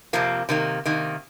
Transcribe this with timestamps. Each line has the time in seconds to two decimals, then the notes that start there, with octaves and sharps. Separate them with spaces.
0.13 F2 C3 F3 A#3
0.49 C3 D#3 A#3
0.86 C3 D#3 A#3